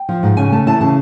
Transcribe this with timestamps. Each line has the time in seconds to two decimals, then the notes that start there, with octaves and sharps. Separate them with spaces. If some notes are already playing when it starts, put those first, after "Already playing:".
Already playing: G5
0.09 F3
0.23 G#2
0.37 C#3 G#5
0.52 A3 A5
0.67 E3 A5
0.81 C#3 A5